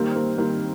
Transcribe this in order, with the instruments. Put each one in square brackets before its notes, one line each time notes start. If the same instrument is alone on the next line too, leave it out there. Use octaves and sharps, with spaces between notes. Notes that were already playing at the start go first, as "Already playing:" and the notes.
Already playing: [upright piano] D#3 G3 [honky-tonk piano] A#3 C4
[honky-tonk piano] A#3
[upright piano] D#3 G3 [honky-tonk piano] A#3